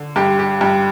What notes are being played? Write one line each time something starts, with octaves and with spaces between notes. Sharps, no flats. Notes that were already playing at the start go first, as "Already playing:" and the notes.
Already playing: D3
G2 G4
G4
G2 G4